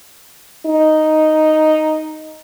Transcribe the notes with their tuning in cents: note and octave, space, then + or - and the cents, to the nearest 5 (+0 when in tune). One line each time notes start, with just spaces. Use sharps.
D#4 +0